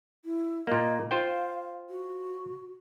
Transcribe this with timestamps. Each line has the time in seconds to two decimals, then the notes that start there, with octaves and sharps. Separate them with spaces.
0.25 E4
0.67 A#2 A#3 D#5
1.11 F4 C5 F5 G5
1.90 F#4